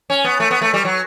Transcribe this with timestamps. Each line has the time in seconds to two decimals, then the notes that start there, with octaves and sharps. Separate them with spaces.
0.10 C#4
0.24 B3
0.40 A3
0.51 B3
0.62 A3
0.74 G3
0.85 F#3